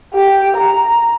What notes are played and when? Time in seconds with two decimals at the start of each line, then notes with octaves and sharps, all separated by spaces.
0.14 G4
0.56 A#5